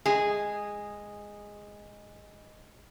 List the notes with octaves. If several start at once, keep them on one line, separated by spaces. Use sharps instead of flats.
G#3 G#4